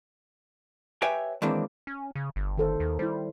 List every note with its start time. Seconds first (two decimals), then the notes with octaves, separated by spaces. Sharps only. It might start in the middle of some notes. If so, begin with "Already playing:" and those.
1.02 G4 B4 C#5 E5 G5 G#5
1.42 D#3 E3 G#3 A#3 C4 D4
1.87 C#4
2.15 C#3
2.36 G1
2.58 D#3 A4 C5
2.80 D#2
2.99 G3 E4 C5